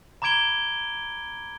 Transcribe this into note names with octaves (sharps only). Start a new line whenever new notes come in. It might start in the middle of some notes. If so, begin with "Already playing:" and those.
A#5 B5 D6 G#6 D7 G7